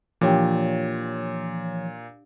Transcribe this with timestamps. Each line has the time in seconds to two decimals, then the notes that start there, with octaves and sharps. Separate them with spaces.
0.21 A#2 E3 F3 D4 G4 C#5 G5